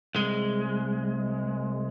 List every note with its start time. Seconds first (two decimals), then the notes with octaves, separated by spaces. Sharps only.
0.15 C2 G#3